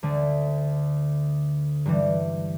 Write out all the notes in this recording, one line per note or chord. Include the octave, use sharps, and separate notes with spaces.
D2 D3 A3
G2 E3 G3